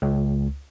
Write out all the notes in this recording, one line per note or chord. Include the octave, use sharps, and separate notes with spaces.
C#2